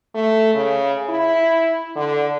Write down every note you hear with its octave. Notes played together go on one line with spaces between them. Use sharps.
A3
C#3
E4
D3